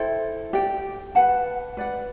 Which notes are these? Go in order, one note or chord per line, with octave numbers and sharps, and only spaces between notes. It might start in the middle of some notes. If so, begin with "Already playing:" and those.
Already playing: E4 A4 C5 G5
G4 D5 G5
B4 F#5 A5
B4 D5 F#5